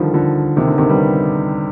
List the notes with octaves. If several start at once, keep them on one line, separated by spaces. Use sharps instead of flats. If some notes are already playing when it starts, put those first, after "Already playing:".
Already playing: D3 D#3 F3 G3
D3 F3
C3 D#3
D3
C3 D#3
G3 B3